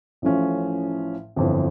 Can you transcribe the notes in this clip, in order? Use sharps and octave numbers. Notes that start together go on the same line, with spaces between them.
A1 A2 F3 C#4
G1 F2 E3